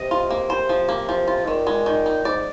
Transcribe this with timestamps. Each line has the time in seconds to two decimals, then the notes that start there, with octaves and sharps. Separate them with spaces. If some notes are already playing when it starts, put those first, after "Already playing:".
Already playing: C3 D#5
0.11 F4
0.30 A#3
0.50 C5
0.69 F3
0.89 A#3
1.09 F3
1.28 F4
1.43 G#2
1.47 A#2 D#3
1.67 G#3
1.86 D#3
2.06 D#4
2.25 G#2 D5